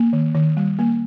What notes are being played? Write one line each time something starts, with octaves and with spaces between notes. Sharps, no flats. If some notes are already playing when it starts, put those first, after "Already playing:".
Already playing: A#3
D#3
D#3
G3
A#3